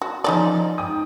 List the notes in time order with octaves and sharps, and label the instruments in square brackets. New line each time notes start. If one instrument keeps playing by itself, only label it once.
[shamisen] F#4
[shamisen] C#3 D#4 D5 [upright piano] F3 C#4
[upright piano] G#2 G5 D#6